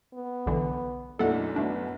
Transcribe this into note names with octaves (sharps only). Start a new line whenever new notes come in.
B3
B1 D3 E3
B1 F#2 A2 D4 A4 F#5
A3 B3 D4